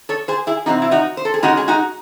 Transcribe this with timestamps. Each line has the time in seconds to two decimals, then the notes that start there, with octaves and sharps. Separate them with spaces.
0.09 A4 C#5
0.28 G#4 C5
0.47 E4 G#4
0.66 C3 E3 C4 D#4 F#4
0.82 E4
0.91 D#4 F#4
1.17 C5
1.25 A4
1.34 G#4
1.43 C#3 G#3 C#4 D#4 F#4
1.57 G#4
1.68 D#4 F#4